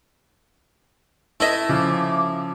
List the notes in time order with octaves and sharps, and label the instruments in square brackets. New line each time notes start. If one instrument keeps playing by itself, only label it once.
[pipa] A3 D#5 E5 [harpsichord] E4
[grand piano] C#3 F3 [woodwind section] D6